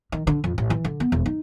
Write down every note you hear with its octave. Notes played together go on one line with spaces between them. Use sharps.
D#3
D3
F2
A1
E3
D3
B3
E1
D#4